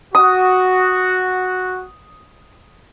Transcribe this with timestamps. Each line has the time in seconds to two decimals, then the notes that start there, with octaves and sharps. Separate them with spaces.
0.15 F#4 D#6